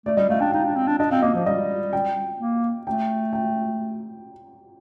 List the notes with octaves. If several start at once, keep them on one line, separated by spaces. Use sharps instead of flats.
A3 D5
G3 D#5
A3 F5
D4 G5
D#4 F5
D4
C4
D4
D4 D#5
C4 F5
A#3 D#5
F3 F5
G3 D#5
G5
A#3
A3 G5
G5